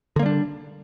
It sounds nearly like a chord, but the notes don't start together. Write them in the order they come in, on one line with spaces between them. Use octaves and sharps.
D3 A#3 G3 D4